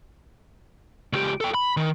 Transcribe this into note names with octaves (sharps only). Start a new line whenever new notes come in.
C#2 G4
A4 G5
B5
D#3